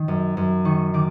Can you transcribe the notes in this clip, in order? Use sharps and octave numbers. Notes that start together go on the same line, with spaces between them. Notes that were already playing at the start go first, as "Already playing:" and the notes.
Already playing: D#3
F#2
F#2
D#3 C#6
D#3 D6